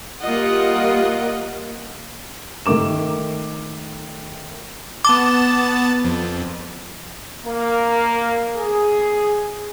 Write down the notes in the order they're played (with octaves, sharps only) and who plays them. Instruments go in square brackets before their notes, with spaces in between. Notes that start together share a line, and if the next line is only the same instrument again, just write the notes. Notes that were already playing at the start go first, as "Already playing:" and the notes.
[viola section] G3 A#3 F4 D#5 F#5
[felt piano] D#3 A3 A#4 D6 E7
[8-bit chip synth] B3 A5 A6 [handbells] D6
[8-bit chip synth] F2
[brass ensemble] A#3
G#4